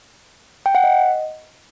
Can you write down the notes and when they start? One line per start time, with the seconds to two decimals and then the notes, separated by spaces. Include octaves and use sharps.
0.66 G5
0.75 F#5
0.84 D#5